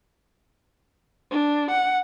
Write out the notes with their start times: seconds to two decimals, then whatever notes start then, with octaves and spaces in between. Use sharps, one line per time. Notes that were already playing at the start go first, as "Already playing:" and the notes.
1.31 D4
1.71 F#5